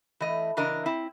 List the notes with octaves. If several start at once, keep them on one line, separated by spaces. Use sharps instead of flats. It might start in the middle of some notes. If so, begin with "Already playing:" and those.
E3 A3 D#5
C#3 E3 D4 A#4 D#5
C4 E4